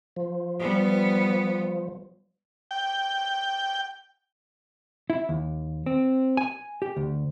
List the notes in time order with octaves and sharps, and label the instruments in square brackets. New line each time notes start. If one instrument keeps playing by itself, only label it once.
[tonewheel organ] F3
[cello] G3 B3
[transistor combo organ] G5
[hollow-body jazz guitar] E4
D#2
C4
G#5
G4
D2